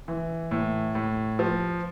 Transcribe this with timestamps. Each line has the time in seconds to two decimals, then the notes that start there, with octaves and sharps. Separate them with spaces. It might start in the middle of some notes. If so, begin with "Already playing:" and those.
0.08 E3
0.51 A2
0.95 A2
1.39 F3